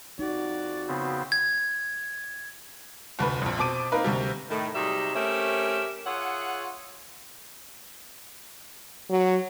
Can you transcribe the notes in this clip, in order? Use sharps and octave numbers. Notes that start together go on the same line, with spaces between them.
F2 D#4 F#4 D5
C#3 B3 C4
G#6
F1 D2 B4
A#1 F2
B2 C4 A5 D6 D7 D#7
A#3 C4 D#4 A#4 B4
D2 C3 G3
A2 D#3 A3
C3 F#3 G3 D#4 G#4 E5
A3 C4 C#4 G4 A#4 E5
F4 G#4 C#5 E5 F#5
F#3